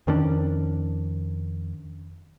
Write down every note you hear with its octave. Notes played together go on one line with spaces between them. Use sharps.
F2 D#3 C#4 D4